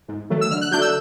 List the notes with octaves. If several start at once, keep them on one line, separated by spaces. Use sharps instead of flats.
G#2
D#3 F#3 A3
E6
D3 F6
F#6
F#3 A3 D4 G6
E6